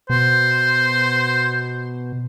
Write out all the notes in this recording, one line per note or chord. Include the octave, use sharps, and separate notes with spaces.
B2 C5